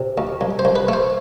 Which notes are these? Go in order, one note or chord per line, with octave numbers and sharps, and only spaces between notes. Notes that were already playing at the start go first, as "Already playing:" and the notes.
Already playing: C3
D2
C2
C5
C2
B4
A3 C5